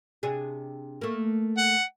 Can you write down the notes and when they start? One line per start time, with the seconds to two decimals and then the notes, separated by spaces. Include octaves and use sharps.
0.23 C3 D4 G#4
1.01 A3 A#3
1.58 F#5